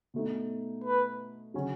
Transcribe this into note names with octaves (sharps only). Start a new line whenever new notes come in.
B2 A3 D#4
B4
C#3 F#3 C#4